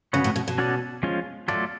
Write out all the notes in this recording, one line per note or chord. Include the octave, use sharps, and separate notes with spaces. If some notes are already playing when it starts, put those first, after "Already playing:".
C#3 B3 F#4 C#5
A2
B2
B2
C#4 F#4 A4 D5
F3 G#3 C#4 F4
A2 F#3 A3 F4 A4 D5